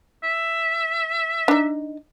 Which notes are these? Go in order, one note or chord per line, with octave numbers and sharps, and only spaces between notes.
E5
D4 D#4